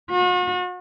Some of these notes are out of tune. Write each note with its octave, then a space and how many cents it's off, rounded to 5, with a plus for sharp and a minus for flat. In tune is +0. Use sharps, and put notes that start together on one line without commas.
F#4 -45